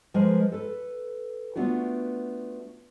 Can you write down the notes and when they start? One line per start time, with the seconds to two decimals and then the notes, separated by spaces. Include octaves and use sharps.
0.14 F3 G#3 A#4 B4
0.52 A4 B4
1.55 A3 B3 D4 F4 F#4